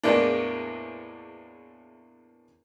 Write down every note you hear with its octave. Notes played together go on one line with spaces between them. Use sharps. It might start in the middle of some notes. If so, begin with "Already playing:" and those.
E2 A2 G#3 A#3 B3 D4